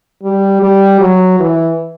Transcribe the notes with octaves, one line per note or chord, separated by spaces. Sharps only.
G3
G3
F#3
E3